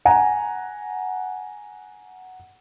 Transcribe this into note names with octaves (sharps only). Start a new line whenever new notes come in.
F#5 G#5 A#5